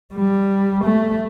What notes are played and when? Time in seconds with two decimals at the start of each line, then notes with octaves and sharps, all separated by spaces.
0.15 G3
0.84 A3